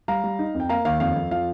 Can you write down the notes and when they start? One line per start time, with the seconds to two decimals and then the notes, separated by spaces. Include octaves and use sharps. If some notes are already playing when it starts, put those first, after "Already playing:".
0.08 G3 F5 A#5
0.24 G3
0.39 D#4
0.55 F2
0.60 G5
0.69 A#3 F5 A#5
0.85 D#2 F5
1.00 F2 F5
1.16 F2
1.31 F3 F5